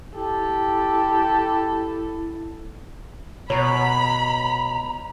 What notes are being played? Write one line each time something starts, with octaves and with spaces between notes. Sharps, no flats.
E4 G4 A4
B2 C#5 A#5 B5